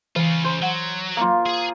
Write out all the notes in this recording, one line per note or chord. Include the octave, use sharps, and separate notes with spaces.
C#3 E3 F4
C5
F#3 F#5
A#3 F4
G#4 G#5